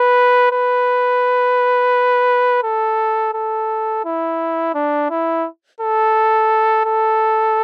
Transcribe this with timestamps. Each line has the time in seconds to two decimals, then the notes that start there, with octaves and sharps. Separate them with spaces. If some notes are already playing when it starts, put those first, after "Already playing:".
Already playing: B4
0.52 B4
2.63 A4
3.34 A4
4.05 E4
4.74 D4
5.10 E4
5.81 A4
6.85 A4